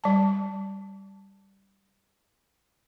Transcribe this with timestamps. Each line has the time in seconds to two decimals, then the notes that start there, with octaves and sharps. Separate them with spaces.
0.04 G3 A5